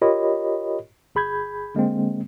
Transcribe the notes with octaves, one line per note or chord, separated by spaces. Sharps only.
F4 G4 A#4 C#5 D#5 B5
G1 G#4 B5 G6 G#6
D3 G#3 A#3 C4